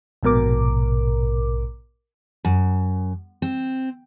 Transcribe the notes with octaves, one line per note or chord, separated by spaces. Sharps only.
A#1 G#2 B2 A#4 D6
F#2
C4